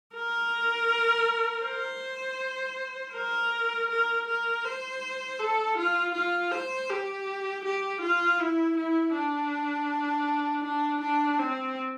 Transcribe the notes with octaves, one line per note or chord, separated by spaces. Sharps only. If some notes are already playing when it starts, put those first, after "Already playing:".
A#4
C5
A#4
A#4
A#4
C5
A4
F4
F4
C5
G4
G4
F4
E4
E4
D4
D4
D4
C4